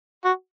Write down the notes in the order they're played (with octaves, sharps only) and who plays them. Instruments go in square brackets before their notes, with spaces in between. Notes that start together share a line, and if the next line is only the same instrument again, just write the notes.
[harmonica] F#4